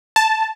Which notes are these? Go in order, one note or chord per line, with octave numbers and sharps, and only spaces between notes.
A5